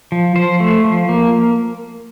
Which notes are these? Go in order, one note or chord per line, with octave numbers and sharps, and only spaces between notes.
F3
F3 C5
A3
F3
A#3